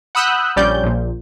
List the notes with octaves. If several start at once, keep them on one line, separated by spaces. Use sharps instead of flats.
F#5 B5 D#6 E6 F#6 G6
A#1 G3 C#4 D5 G6
A#1 A#2